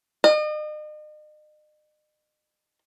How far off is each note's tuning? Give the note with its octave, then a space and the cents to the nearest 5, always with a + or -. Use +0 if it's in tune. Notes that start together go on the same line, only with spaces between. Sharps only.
D#5 -40